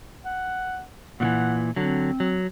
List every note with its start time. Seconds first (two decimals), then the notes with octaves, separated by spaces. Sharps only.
0.25 F#5
1.20 A#2 D#3 E3 F#5
1.76 D3 F#3 C4
2.20 F#3